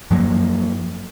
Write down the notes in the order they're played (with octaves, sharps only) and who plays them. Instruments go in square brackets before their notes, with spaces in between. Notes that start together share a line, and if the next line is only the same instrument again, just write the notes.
[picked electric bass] F#2 F3 F#3 A#3